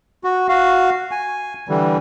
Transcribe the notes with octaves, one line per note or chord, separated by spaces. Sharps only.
F#4
F#4 F5
G#5
D3 E3 G3